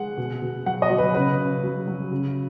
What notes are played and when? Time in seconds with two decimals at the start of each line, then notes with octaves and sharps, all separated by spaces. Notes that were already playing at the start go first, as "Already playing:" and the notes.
Already playing: G#3 F#5
0.18 B2
0.42 B2
0.66 F#3 F#5
0.82 D#5
0.90 F#3
0.98 B4
1.15 C#3 B4
1.39 C#3
1.63 F#3
1.88 F#3
2.11 C#3